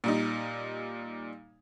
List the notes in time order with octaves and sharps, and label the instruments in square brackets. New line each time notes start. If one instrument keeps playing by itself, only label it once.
[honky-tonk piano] A#2 G3 D#4